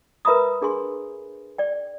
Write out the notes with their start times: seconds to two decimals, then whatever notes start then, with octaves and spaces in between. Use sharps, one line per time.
0.25 A#4 B4 E5 A#5 B5 D#6
0.62 D4 G#4 G#5 C6
1.58 D5 G5